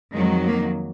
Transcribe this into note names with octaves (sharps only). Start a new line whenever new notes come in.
F2 D#3 F#3 G#3
A#3